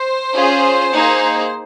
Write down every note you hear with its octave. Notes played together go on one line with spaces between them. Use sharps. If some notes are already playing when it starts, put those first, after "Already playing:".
Already playing: C5
C#4 F4 G#4
A#3 D#4 G#4